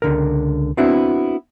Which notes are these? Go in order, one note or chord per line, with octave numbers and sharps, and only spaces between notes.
C#2 D3 A#4
B3 C4 D4 E4 F#4